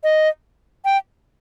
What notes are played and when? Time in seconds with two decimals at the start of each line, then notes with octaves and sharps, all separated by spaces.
0.04 D#5
0.85 G5